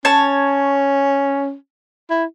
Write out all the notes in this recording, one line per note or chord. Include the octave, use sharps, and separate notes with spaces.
C#4 C#5 A5
E4